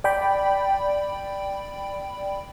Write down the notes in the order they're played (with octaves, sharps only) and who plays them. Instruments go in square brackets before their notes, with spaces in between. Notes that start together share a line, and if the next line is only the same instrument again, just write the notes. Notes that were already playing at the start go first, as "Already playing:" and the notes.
[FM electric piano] D5 G5 B5